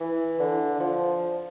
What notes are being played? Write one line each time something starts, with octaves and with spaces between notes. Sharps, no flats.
E3
D3
F3